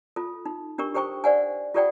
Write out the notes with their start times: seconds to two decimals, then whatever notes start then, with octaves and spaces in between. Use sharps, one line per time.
0.16 F4 A4
0.46 D#4
0.78 D4 G4 A#4 C#6
0.95 G4 A4 C5 G5 C#6
1.24 C5 D5 F#5 G#5
1.74 F4 G4 A4 D5 F#5 G5